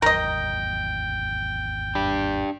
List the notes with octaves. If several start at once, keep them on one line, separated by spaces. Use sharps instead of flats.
G#1 E2 F#3 A#4 D#5 G5
D4 G4